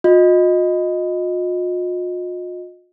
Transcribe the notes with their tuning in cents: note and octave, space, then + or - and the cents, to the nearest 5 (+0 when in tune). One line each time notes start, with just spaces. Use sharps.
F4 +45 D#5 +0